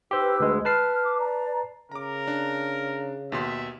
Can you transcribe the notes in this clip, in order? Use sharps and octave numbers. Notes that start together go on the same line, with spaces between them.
D#4 G4 B4 C5 E6
D2 G#3
B4 A5 F6 C7
D6
D5 A#5
C#3 A#4 A#5 D6
D4
D#2 B2 E5 C6